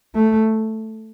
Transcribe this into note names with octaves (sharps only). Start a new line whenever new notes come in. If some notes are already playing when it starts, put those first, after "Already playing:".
A3